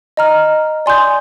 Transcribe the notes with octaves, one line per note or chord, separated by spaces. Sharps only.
D#5 A#5 F6
D5 G#5 C6 D#6 G6